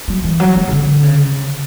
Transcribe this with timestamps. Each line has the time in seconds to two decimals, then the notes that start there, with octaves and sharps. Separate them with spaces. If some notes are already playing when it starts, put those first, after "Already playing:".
0.08 F#3
0.23 E3
0.40 F#3
0.56 F#3
0.67 C#3
0.71 D3
1.03 C#3